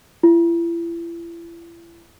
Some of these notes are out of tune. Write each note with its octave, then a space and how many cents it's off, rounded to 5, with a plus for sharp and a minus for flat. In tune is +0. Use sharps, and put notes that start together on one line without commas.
E4 +40